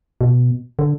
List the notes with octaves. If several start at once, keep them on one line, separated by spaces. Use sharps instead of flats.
B2
D3